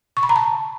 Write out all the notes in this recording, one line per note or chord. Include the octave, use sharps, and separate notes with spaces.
C#6
B5
A#5
A5